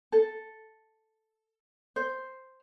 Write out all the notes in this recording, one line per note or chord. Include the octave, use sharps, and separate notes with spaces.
A4
C5